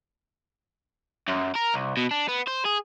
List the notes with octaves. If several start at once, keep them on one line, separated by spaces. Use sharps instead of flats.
F#2
A#4
C2
B2
D4
B3
C5
G#4